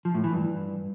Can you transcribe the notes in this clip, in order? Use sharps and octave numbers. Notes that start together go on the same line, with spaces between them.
F3
A2
E3
G2